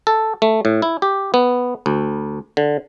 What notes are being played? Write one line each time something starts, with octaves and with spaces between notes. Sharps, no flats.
A4
A3
A2
E4
G4
B3
D2
D3